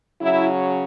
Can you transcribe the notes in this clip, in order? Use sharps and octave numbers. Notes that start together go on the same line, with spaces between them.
C#3 F#3 C#4 E4